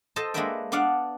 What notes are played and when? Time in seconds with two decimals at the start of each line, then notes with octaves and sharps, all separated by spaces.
0.16 A4 C5 D#5 A5
0.34 G#3 A#3 D4 B4 E5 G5
0.72 B3 D4 D5 F5 F#5